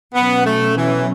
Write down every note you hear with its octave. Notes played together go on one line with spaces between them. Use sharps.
B2 F#3 B3 C#4
A3
E3